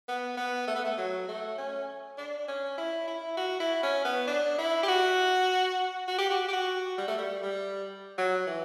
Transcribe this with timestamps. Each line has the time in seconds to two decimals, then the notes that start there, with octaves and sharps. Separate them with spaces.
0.08 B3
0.37 B3
0.67 A3
0.75 B3
0.84 A3
0.98 F#3
1.28 A3
1.58 C#4
2.17 D4
2.48 C#4
2.78 E4
3.08 E4
3.37 F#4
3.60 E4
3.83 C#4
4.05 B3
4.27 D4
4.58 E4
4.83 G4
4.88 F#4
6.08 F#4
6.18 G4
6.30 F#4
6.48 G4
6.53 F#4
6.98 G3
7.08 A3
7.18 G3
7.43 G3
8.18 F#3
8.47 E3